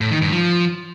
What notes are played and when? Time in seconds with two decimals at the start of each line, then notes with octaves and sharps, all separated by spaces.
0.01 A2
0.11 D#3
0.22 G2
0.32 F3